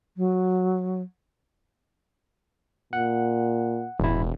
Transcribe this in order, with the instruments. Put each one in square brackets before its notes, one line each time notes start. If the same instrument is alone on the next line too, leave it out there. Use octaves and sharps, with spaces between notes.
[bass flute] F#3
[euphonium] A#2 [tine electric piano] F#5
[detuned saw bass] E1 [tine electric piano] A1 E4